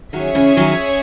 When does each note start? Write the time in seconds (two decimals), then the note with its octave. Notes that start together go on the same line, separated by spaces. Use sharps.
0.13 D#3 F#3 C#4 G#4 C#5 E5
0.35 C#3 E3
0.57 D#3 F#3